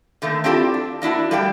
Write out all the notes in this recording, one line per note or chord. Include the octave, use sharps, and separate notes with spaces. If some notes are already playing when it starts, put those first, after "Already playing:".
D3 D#3 A3 A#3
C4 D4 E4 F4 G4 A4
D4
A#3 D4 E4 F#4
G3 A3 G4 F5 G5